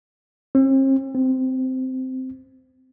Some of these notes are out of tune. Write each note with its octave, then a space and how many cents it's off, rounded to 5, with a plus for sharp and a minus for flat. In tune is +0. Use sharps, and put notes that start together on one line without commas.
C4 +45
C4 -10